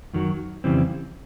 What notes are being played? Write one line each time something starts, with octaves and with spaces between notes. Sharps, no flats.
F#2 D#3 F#3
F2 C#3 E3 G3 C4